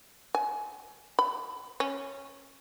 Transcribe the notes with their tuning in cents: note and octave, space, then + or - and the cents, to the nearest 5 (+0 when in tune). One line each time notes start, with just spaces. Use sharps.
G#5 +20
B5 +20
C#4 -10